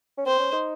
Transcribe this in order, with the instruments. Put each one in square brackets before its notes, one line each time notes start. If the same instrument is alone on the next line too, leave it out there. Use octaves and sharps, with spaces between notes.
[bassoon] C#4
[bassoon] C4 [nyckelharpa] C5
[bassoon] C#4
D#4